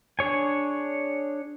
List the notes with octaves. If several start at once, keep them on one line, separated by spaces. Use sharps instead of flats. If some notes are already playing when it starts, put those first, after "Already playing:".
D4 G#4 C#5 G#5